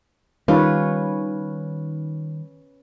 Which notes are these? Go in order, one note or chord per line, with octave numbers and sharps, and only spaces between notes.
D#3 G3 C#4 F4 B4 C#5